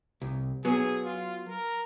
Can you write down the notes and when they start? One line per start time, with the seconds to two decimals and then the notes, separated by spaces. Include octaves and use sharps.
0.21 C2
0.65 F#3 B3 G#4
1.05 F4
1.48 A#4